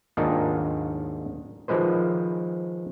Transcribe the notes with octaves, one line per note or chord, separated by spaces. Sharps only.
D#2 G#2 D#3 D4 D#4 F4
D#3 F3 G#3 B4 C5